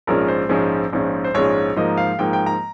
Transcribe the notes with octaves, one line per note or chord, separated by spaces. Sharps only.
A#1 G#2 F3 G#3 C#4 A#4
C5
A#1 G#2 F3 G#3 C#4
A#1 G#2 F3 G#3 C#4
C5
A#1 G#2 F3 G#3 C#4 C#5
G#2 F3 A#3 D#5
F5
G#2 F3 A#3 G5
G5
A#5